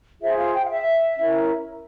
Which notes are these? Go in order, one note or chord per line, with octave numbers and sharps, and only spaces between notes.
F4 G#4 C5 E5
F5
G5
F5
E5
C#4 E4 A#4